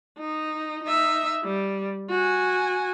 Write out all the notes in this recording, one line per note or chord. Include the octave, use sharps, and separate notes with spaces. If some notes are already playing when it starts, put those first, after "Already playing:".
D#4
D#4 E5
G3
F#4 G#5